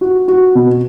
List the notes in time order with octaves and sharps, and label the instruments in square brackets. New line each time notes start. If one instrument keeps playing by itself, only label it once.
[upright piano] F#4
F#4
B2